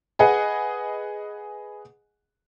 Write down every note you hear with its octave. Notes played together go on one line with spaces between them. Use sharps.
G#4 B4 D#5 F#5 G#5